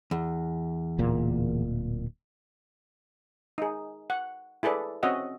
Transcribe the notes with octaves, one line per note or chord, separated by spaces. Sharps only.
E2
D1 A#2 A#3
D#4 G#4
F#5
E4 G#4 A4 B4 D5
C4 C#4 F#4 D#5 E5 F#5